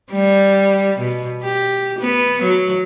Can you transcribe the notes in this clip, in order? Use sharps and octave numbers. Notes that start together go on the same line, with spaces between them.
G3
B2
G4
B3
F#3